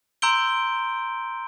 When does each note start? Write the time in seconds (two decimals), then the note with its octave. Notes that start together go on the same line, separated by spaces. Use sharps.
0.22 A#5 C6 E6 G6 D7 G7